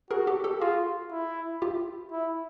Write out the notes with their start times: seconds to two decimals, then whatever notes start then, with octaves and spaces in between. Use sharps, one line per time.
0.11 F#4 G#4 A#4
0.27 G4 A4
0.44 G4 A4
0.61 F4 F#4 G#4
1.11 E4
1.62 F4 G4
2.12 E4